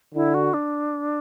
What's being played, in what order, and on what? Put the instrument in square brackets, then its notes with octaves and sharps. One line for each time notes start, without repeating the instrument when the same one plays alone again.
[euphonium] D3 [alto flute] E4
[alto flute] F#4
D4